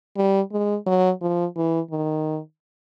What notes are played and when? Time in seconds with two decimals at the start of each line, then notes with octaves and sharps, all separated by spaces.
0.17 G3
0.52 G#3
0.86 F#3
1.21 F3
1.56 E3
1.91 D#3